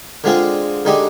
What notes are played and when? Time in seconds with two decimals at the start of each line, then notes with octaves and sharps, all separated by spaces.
0.24 D3 G#3 C4 F4 G#4
0.85 D3 G#3 D#4 G4